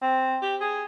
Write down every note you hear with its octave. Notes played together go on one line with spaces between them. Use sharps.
C4
G4
G#4